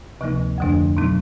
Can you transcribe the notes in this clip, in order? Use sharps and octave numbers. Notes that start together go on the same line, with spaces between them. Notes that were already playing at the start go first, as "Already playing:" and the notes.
D2 C3 F3 A#3 D#4
F2 D3 F3 A3 D4
B2 F#3 B3 D#4